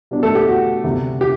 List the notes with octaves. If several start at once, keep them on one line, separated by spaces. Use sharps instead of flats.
B2 G3 D4
A3 A4
G4
F#4
D2 C3 G3
G4